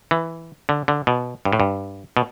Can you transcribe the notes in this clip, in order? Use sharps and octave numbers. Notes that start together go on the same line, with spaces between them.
E3
D3
D3
B2
G2
A2
G2
B2